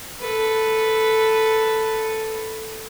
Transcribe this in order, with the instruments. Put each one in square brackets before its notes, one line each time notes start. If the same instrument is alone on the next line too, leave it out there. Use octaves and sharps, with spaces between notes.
[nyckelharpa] A4 B4